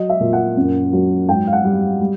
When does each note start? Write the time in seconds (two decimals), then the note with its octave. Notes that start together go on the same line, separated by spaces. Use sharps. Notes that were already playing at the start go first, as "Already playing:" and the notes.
Already playing: F#3 D#5
0.09 E5
0.20 A#2
0.33 F#5
0.57 F#2
0.93 F#3
1.29 G#2 G5
1.47 F5
1.53 F#5
1.64 G3
2.01 G3